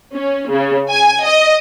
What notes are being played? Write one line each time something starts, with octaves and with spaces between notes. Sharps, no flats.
C#4
C#3
G#5
D#5